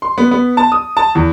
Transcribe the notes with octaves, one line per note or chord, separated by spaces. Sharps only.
C6
B3
B3
A5
D#6
A5
E2